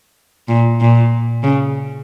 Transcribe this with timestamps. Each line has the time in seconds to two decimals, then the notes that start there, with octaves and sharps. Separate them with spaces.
0.48 A#2
0.81 A#2
1.43 C#3